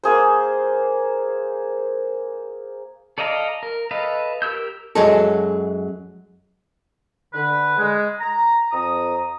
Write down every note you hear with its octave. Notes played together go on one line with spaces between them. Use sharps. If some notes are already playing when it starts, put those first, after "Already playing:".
A#3 G#4 C5
A4 D5 D#5 F5 A#5
A#4
A4 B4 D#5 F5
G4 A#4 E6 G6
F#2 F#3 G#3 A4
D3 B4
G#3
A#5
F2 A#5 D#6